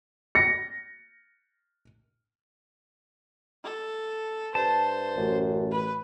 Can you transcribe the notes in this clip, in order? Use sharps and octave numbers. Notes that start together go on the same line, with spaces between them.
A#6 C#7
A4
G2 C5 A5
A1 F#2
B4